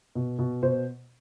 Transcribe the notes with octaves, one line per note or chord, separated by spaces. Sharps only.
B2
B2
B2 C5